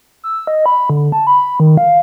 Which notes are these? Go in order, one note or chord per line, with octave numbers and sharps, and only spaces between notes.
E6
D#5
B5
D3
A5
B5
D#3
F5